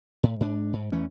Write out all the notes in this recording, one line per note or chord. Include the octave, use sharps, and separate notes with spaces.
A2
G#2 D4
G#2
E2 E3 A3 C#4